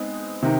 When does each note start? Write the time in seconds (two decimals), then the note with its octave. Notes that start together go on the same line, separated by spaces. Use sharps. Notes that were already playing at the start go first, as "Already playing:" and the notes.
Already playing: G#3 B3 C4 D#4
0.43 C3 D#3